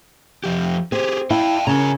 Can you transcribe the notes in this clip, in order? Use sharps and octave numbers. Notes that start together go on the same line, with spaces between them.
F2 F3 G4
C4 G4 G#4
E4 F5 G5 A5
C#3 A#4 G#5 A#5